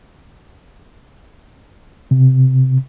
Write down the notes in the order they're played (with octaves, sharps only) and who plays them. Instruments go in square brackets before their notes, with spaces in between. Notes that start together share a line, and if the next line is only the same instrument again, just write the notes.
[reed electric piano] C3